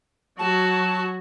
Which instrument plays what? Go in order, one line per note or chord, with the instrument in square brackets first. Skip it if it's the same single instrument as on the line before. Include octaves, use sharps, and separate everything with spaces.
[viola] F#3 F#4 [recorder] A5